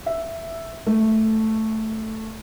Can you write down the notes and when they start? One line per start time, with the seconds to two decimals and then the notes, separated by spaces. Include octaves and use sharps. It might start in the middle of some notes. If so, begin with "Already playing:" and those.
0.06 E5
0.87 A3